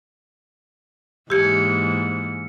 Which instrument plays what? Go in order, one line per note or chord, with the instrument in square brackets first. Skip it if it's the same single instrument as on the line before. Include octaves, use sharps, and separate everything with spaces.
[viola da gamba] G#2 E3 A#3 [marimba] G4 G#6 [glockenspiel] E6 F6 C#7